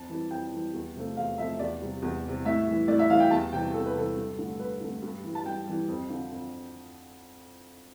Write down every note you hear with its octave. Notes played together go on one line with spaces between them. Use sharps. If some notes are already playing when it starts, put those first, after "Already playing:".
Already playing: F2 A5
E3 G3
F2 G5
E3 G3
E2
C3 F3 A3
E2 F5
C3 F3 A3 E5
E2 D5
C3 G3
E2
C3 G3
A2 E5
E3 G3
A2 D5
E5
E3 G3 F5
G5
E2 A5
C3 E3 G3 G5
E2 A4
B4
C3 E3 G3 A4
G2
D3 A3
G2 B4
D3 A3
G2
E3 G3
A5
G2 G5
E3 G3
F2
D3 F3
F2